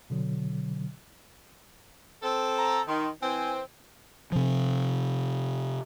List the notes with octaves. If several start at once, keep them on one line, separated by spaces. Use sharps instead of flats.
B2 D3 F#3
C4 A4
A#5
D#3 C6
E3 C4 G#5
C3 F3